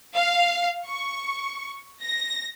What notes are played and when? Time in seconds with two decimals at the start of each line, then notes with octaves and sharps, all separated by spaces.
0.14 F5
0.86 C#6
2.01 A#6